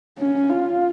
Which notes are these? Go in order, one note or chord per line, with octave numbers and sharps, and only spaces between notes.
C#4
F4